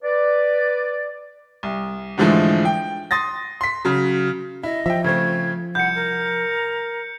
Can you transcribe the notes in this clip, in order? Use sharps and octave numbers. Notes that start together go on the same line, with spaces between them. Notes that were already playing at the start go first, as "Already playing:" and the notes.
B4 D5
C2
G#2 D3 E3 F3 G#3 A3
G5
C6 D#6 A6 A#6
C6 B6
C#3 F#3
E4 D#5
F3 E5 G5
C#3 A3 C4 G#6
C2 F#5 G6 C#7
A#4